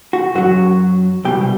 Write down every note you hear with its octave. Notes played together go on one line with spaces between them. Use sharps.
F#4
F#2 F#3 F#4
C2 B2 G3 G4